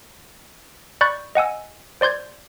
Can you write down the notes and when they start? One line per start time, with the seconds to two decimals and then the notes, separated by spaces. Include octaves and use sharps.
1.01 D5 B5 C#6 F#6 G6 A6
1.35 D#5 F#5 G#5 E6
2.01 C5 D5 C6 G6 G#6